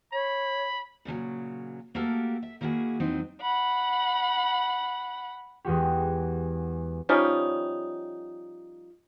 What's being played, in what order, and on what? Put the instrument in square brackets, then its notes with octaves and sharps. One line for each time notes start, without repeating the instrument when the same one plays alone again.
[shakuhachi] C#5 [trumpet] B5
[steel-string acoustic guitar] A#2 C#3 F3 F#3
A3 A#3 F#4 G4 A4 A#4
E5
D#3 A#3 E4 F#4 G#4
F2 E3 F#3 C4 D#4
[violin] F#5 B5
[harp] E2 G#3 F#4 G4
[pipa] F3 G3 C#4 D#4